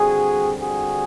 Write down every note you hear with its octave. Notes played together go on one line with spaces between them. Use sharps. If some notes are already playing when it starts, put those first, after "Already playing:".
Already playing: D3 G3 C4 F#4 G#4
F#4 G#4